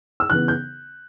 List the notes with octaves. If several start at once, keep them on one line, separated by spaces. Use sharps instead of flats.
E6
C#3 E3 B3 F#6
G6